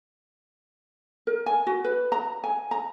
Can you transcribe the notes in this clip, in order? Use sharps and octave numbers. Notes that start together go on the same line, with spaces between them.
A#4
G#5
F#4
B4
A#5
G#5
A#5